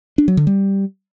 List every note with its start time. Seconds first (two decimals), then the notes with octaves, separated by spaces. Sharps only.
0.18 D4
0.28 F#3
0.37 D3
0.47 G3